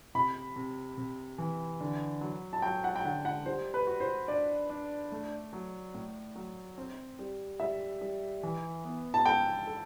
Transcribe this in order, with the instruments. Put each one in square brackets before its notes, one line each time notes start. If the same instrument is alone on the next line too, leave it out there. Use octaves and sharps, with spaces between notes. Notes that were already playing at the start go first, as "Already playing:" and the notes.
[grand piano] C3 [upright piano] B5
[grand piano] C3
C3
E3
D3
F#3
[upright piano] A5
[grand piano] F#3 [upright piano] G5
[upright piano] F#5
G5
[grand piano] D3 [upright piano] F#5
[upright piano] F#5
[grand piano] G3 [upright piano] C5
[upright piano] B4
[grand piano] F#4
[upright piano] C5
[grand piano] D4 [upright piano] D5
[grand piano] D4
A3
F#3
A2
F#3
C4
G3
[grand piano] G3 [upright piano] E5
[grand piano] G3
E3
B3
[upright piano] A5
[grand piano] A4 [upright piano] G5
[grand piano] A4